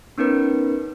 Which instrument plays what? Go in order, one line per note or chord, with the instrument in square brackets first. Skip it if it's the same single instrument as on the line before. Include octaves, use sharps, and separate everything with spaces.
[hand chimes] B3 C#4 D#4 A#4 B4